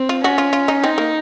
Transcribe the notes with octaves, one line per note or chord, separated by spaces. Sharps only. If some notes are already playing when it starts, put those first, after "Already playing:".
Already playing: C4
F4
C#4 F#4
F4
F4
D#4
C4 D#4
A#3